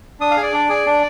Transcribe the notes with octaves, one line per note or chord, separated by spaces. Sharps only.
D4 D#6
F5
G#4
D5
D4
G#4
D4